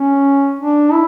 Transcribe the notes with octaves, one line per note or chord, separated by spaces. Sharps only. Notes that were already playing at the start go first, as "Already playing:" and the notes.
Already playing: C#4
D4
E4